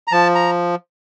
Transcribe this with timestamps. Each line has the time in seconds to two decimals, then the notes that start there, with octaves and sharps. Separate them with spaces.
0.07 A#5
0.12 F3 A5
0.35 A#5